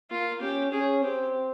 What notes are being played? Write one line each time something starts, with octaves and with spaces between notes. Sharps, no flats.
A#3 F4
C#4 G4
C#4 G#4
C4 G4